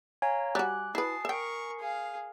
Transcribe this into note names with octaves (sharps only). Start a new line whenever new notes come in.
C#5 F5 G#5 A#5
G3 F#4 D6 F#6
E4 F#4 B4 A5 D#6 C7
A#4 E5 G5 C#6
G#4 F5